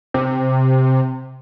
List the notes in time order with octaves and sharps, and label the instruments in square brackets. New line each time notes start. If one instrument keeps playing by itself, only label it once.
[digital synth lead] C3